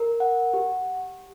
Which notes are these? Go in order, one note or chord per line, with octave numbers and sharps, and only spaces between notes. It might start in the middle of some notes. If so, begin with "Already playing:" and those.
Already playing: A#4
F#5
G4